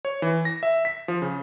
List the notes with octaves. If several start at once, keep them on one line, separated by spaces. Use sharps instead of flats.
C#5
E3
A#6
E5
B6
F3
C#3